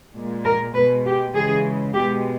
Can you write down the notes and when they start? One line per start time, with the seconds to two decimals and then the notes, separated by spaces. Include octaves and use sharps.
0.15 A#2 G#3
0.44 A#4
0.74 B2 G#3 B4
1.05 G4
1.34 C#3 E3 G#3 G#4
1.94 B2 G#3 G4